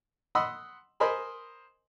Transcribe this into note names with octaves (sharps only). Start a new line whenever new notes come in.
D#5 F#5 B5 C6 D#6 E6
A#4 C5 D#5 G#5 B5 C6